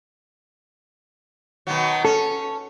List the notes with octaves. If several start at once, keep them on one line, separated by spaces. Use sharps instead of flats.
B2 D#3 F#3
C#4 A4